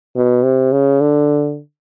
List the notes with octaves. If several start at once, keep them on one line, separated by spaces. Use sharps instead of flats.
B2
C3
C#3
D3